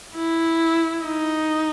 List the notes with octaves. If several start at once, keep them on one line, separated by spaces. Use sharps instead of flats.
E4
D#4